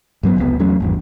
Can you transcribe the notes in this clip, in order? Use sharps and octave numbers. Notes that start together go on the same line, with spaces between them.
G2 F#3 A#3 B3
F1 C#2 A2 B3
E2 F#3 A3 C#4
G#1 E2 G2